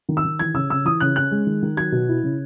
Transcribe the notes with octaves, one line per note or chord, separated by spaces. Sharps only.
D#3
E6
D#3
E3 G#6
C#3 E6
C#3 E6
E3 D#6
C#3 F#6
C#4 F#6
G#3
D#3
D#3
F#3 G#6
B2
E4
C#3